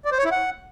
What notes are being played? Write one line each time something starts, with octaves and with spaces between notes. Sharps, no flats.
D5
C5
C#5
E4
F#5